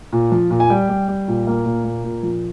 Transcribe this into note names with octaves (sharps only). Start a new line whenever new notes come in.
A#2
F3
A#2
G#5
G3 G5
G3
G3
A#2
A#3
A#2
A#3
A#2
F3